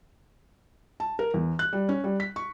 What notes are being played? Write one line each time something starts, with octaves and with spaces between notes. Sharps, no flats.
A5
A#4
E2
F#6
G3
C#4
G3
B6
C#6